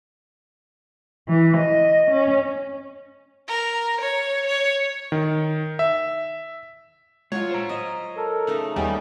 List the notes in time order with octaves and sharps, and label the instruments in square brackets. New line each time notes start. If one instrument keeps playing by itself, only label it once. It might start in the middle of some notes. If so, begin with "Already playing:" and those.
[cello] E3
D#5
C#4
[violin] A#4
C#5
C#5
[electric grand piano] D#3
E5
[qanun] F#3 F4 [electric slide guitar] G#3 [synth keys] C#5
[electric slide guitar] C5 A#5
[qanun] D#5
[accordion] A4 A#4
[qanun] C#3 A3 D#4
[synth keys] D#2 G3 [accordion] A3 B3 C#4 [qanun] D#4